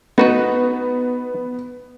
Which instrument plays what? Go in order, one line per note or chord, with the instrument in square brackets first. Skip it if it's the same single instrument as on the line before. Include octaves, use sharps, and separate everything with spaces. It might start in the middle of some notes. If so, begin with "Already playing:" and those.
[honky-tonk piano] B3 [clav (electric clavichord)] D#4 F#4 B4